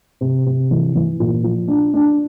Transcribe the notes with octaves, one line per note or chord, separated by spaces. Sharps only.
C3
C3
E3
E3
A#2
F3
D4
D4